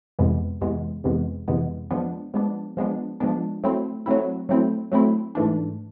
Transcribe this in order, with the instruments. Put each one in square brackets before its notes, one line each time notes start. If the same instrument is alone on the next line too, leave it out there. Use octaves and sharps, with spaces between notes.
[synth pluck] F2 C3 E3 G#3 B3
F2 C3 E3 G#3 B3
F2 C3 E3 G#3 B3
F2 C3 E3 G#3 B3
F3 G#3 B3 D4
F3 G#3 B3 D4
F3 G#3 B3 D4
F3 G#3 B3 D4
F#3 A3 C4 E4
F#3 A3 C4 E4
F#3 A3 C4 E4
F#3 A3 C4 E4
G#2 E3 A3 D4